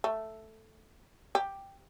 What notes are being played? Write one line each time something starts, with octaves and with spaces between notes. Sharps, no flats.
A3
G4